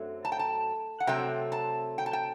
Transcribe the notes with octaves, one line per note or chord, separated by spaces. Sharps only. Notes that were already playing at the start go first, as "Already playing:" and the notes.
Already playing: F#2 D3 F#3 A3 C4
A5
G5
A5
F#5
C3 F#3 A3 C4 G5
A5
G5
A5
G5